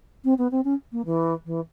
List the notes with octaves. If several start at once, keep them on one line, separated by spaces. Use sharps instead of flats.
C4
B3
C4
C#4
A#3
E3
E3